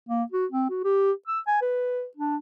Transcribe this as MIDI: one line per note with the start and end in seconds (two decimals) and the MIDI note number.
0.09 0.23 58
0.32 0.45 66
0.52 0.67 60
0.70 0.80 66
0.84 1.12 67
1.27 1.40 88
1.47 1.59 80
1.62 2.05 71
2.17 2.36 62